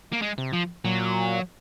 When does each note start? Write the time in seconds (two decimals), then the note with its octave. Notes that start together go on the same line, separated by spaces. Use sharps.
0.12 A#3
0.22 G#3
0.38 C3
0.53 F3
0.84 A#2 F#3